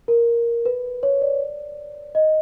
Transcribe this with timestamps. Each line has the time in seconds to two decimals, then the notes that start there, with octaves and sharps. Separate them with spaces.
0.08 A#4
0.66 B4
1.03 C#5
1.22 D5
2.15 D#5